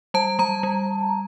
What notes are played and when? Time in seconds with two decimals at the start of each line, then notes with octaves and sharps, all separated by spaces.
0.14 G3 A5
0.39 G3 A#5
0.63 G3